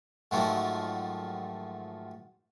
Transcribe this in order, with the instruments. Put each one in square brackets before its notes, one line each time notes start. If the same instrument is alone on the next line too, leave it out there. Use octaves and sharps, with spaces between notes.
[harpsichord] G#2 D#3 F3 F#3 A3